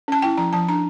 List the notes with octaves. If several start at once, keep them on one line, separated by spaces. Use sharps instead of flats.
C#4 A5
E4 G5
F3 A#5
F3 A5
D4 A#5